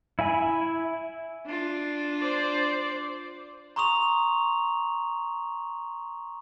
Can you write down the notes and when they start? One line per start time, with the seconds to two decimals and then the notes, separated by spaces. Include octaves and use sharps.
0.19 E4 E5 G#5 B5
1.46 D4 F4
2.20 C5 D5
3.76 A#5 C6 C#6 D#6 F7